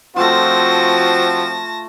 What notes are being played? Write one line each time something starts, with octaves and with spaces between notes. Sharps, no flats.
F3 A3 C4 F4 F#4 A5 A#6